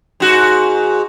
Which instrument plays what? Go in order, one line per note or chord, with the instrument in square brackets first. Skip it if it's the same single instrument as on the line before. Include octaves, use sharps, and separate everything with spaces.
[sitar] G#2 F#4